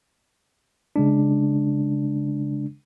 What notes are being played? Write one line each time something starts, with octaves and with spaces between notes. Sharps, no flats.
C#3 G#3 D4